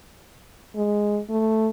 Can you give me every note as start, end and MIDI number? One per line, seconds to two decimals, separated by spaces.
0.76 1.21 56
1.29 1.69 57